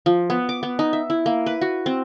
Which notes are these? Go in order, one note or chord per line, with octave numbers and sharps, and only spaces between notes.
F3
B3
D6
B3
D#4
E5
E4
A#3
B4
F#4
C4